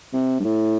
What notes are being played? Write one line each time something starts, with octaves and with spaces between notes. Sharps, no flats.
C3
G2
A2